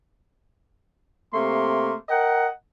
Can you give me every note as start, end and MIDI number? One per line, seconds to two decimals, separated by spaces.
1.34 1.93 48
1.34 1.93 57
1.34 1.93 58
1.34 1.93 84
2.09 2.47 70
2.09 2.47 75
2.09 2.47 78
2.09 2.47 79